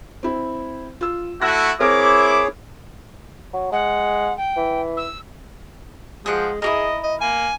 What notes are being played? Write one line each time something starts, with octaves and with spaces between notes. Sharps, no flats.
C4 E4
F4 E6
A3 E4 F#4 E6 F#6 A#6
C4 E4 G#4 A#4 C#5 D6 D7
F#3
G#3 F#5
G5
E3
E6
F3 G#3 G#4 F#5 G5
E4 G4 G#4 A#4 D#5
D#5
A#3 G#5